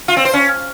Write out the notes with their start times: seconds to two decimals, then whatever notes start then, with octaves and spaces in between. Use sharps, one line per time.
0.08 F4
0.17 C4
0.25 C5
0.33 C#4